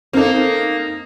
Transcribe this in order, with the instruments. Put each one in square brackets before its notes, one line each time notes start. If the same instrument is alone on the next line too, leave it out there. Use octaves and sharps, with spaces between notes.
[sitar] A#3 D#4 [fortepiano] C4 A4